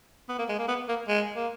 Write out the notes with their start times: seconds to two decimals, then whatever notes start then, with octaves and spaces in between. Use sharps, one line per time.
0.29 B3
0.39 A#3
0.49 G#3
0.59 A#3
0.68 B3
0.88 A#3
1.08 G#3
1.36 A#3